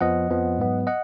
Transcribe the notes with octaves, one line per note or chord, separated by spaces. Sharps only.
F2 F3 B3 D#5 F#5
F2 F3 B3
G#2 F#3 B3
D#5 F#5